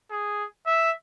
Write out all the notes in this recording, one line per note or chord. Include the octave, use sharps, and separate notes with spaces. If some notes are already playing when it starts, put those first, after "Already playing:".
G#4
E5